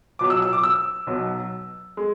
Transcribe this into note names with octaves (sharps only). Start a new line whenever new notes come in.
C#2 B2 F#3 D6
E6
E6
D6
E6
B1 B2 F#3
G#3